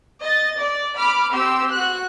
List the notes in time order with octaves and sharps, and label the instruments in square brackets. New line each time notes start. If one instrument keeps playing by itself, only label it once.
[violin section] D#5 A6
D5
B5 D6 F6
C4 G4 C6 E6
F#4 F#6